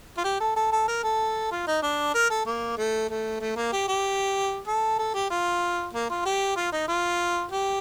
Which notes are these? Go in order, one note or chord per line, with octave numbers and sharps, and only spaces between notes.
F4
G4
A4
A4
A4
A#4
A4
F4
D#4
D4
A#4
A4
A#3
A3
A3
A3
A#3
G4
G4
A4
A4
G4
F4
A#3
F4
G4
F4
D#4
F4
G4